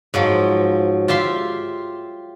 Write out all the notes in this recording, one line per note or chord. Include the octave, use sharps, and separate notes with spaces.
G#2 F3 F#3
F4 G4 E5 C6